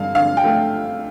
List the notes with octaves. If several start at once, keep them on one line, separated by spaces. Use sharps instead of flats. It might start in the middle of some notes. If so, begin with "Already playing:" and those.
Already playing: G2 D3 F5
D3 F5
G5
A3